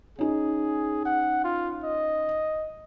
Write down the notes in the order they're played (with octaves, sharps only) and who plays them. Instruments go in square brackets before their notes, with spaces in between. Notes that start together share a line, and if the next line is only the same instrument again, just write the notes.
[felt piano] C#4 D#4 [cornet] G#4
[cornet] F#5
F4
D#5